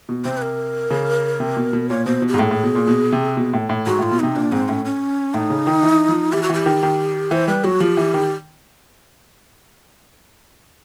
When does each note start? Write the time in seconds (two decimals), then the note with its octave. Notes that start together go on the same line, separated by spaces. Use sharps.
0.09 B2
0.25 C3 C5
0.37 B4
0.42 A#4
0.91 C#3
1.40 C3
1.57 B2
1.73 B2
1.89 A#2 C#5
2.06 B2 C5
2.22 B2
2.28 G4
2.34 G#2
2.39 A2 A4
2.43 G#4
2.51 A2
2.63 B2
2.75 A#2
2.88 B2
3.12 C3
3.37 B2
3.53 A2
3.69 A2
3.86 G#2 F#4
3.99 A2 F4
4.11 B2
4.20 C3 D#4
4.36 A#2 D4
4.52 G#2 C4
4.68 A2 C#4
4.85 C#4
5.34 A2 D#4
5.50 C#3
5.67 D#3
5.83 E3
6.09 F3
6.33 E3 G4
6.43 F#4
6.50 E3 G4
6.66 D#3
6.83 D#3
7.31 E3 C5
7.48 G3 B4
7.64 F#3 F#4
7.80 F3 G4
7.97 E3
8.14 D#3